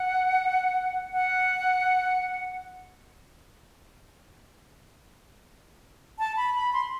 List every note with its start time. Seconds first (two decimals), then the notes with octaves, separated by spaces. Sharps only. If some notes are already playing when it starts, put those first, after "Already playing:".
Already playing: F#5
1.13 F#5
6.19 A5
6.37 B5
6.54 B5
6.73 C6